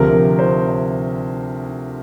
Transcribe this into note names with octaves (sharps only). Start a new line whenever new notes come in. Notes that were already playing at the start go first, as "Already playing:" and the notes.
Already playing: D2 C3 F3 A#4
C5